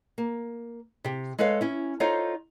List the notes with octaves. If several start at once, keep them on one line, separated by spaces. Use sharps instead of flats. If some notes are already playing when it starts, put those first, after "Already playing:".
A#3
C3 G4
G#3 A4 B4 C#5 F5
C#4 E4
D#4 F4 A4 C5 C#5 D#5